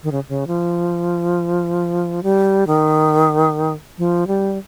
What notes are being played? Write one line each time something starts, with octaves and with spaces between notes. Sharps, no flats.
D#3
C#3
C#3
F3
G3
D#3
F3
G3